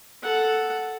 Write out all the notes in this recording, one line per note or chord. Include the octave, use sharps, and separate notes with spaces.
A4 F#5